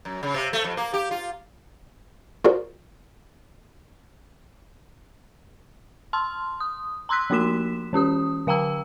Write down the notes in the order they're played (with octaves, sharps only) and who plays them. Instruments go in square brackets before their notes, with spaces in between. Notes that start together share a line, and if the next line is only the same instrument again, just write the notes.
[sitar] F#2
C#3
C3
A3
F2
A#3
G4
F4
[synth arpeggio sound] F4 F#4 G#4 A#4 C5 D5
[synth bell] A5 C6 F6
D#6
A#5 C6 E6 F#6 B6
F3 A#3 D#4 F#4 B6 E7
E3 C#4 G4 D#6
D3 F5 G5 A#5 E6